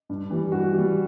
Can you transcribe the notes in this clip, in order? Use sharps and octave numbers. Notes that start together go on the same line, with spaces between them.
G2
E3 G3
G2 F#4
E3 G3